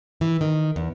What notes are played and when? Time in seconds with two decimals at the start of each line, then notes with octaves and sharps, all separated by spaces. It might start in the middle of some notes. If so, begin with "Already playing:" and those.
0.21 E3
0.41 D#3
0.76 E2